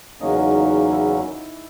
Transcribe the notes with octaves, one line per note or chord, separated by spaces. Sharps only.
E2 C#3 F#3 A#3 C#4 D#4
E4